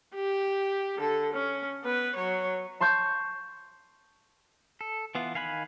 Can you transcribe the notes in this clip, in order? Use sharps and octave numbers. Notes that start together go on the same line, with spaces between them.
G4
D3 A4
C#4
B3 B4
F#3 C#5
A5 C6 C#6 G6
A4
E3 B3 F4
D#3 F5 G#5 B5 F#6